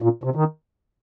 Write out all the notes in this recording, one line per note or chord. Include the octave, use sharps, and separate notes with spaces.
A#2
C3
D#3